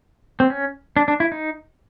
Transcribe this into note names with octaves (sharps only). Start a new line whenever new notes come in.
C4
C#4
D4
D4
E4
D#4